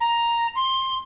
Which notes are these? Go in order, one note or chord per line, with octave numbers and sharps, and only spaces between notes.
A#5
C6